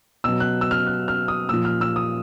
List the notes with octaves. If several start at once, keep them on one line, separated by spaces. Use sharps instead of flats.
B2 F#3 E6
F#6
E6
F6
F#6
F6
D#6
A#2 F3 E6
F6
E6
D#6